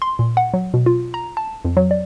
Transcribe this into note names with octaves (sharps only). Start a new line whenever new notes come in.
C6
A#2
F#5
F#3
B2
F4
A#5
A5
F2
F#3
D5